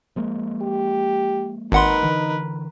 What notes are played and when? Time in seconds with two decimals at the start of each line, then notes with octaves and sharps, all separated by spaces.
0.16 F3 G#3 A#3
0.62 G4
1.72 G#1 D#4 A#4 B4 F#5 C6
2.03 D3 E3